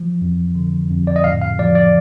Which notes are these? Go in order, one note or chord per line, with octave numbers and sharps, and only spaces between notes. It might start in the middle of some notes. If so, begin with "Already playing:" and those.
Already playing: F3
F2
D3
F2
D5
D#5
A2 F5
F5
F3 D5
D5